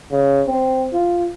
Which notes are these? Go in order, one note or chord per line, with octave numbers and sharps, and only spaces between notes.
C#3
C4
F4